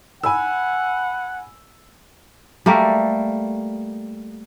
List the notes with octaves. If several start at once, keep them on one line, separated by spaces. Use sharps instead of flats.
F#5 G#5 B5 E6
G3 A3 A#3